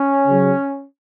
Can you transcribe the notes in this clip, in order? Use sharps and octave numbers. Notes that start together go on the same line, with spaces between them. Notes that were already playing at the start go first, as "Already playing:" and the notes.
Already playing: C#4
C#3 F#3